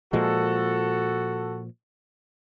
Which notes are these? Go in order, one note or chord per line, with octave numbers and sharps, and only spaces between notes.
A#2 F3 G#3 F#4 A4